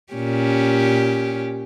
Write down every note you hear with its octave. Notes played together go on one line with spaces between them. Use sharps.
A#2 C#4 G4